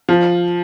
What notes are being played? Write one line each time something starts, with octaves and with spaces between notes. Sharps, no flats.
F3